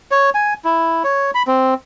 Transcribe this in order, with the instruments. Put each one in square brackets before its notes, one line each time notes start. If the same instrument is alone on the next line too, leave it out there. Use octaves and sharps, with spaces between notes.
[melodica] C#5
G#5
E4
C#5
B5
C4